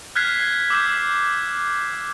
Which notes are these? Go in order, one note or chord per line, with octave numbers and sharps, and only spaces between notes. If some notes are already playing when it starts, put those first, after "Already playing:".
F6 F#6 G#6 B6 C7
D6 E6 G6 B6 E7